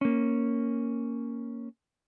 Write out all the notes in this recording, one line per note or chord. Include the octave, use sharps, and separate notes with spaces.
A#3 C#4